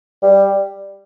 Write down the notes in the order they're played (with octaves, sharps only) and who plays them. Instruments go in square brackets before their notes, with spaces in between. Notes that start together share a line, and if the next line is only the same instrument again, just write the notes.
[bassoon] G3